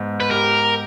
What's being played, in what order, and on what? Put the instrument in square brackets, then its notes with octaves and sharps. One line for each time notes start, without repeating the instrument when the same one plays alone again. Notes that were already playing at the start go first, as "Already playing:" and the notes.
Already playing: [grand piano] G#2 B3
[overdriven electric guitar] B4
[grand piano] G4 [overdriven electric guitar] A#4